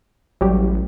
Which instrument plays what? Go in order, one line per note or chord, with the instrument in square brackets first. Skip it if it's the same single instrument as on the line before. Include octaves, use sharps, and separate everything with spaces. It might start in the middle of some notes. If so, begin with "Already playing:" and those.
[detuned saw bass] A1 [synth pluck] F#3 G3 G4